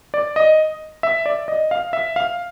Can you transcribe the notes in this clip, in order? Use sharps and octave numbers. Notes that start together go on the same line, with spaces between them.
D5
D#5
E5
D5
D#5
F5
E5
F5